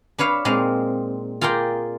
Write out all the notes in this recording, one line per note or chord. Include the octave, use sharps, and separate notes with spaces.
D4 B4 C#5 F5
A#2 G#3 C4 D#4 F5
F4 G#4 A#4 D5 G5